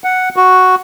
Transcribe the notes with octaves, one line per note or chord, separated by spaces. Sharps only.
F#5
F#4